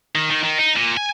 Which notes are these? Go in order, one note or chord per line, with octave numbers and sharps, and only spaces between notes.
D#3
D#3
D#3
D#4
A#2
G#5